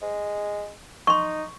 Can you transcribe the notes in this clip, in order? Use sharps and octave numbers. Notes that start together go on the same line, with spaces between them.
G#3
D#4 C6 C#6